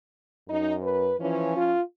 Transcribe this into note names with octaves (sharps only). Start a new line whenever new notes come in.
F#2 D#4
B4
E3 F3 C#4
F4